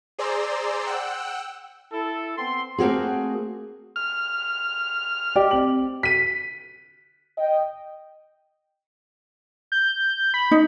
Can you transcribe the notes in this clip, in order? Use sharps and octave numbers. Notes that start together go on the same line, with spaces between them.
G#4 C5 D5 A#5 C6 E6
F#5 G5 E6 F#6
E4 A4
B3 C4 C6
A3 A#3 C4 F#4 G#4
F6
G4 D5 D#5
C4 F#7
B6 D#7
D#5 G5
G6
B5
D#4